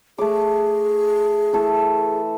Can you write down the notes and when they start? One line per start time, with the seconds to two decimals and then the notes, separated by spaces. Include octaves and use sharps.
0.18 A3 G#4 D6
1.53 E3 A3 A4